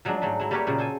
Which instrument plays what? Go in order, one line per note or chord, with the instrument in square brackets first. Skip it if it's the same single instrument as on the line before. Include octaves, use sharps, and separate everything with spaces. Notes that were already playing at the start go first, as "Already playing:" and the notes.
[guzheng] F3 F#3 G#3 A3 D4
G#2 F#3 A3
F#3 E4
G3 A#3 G4 A#4 B4 C#5
A#2 C#3 F#3 C5
A4 C5 G#5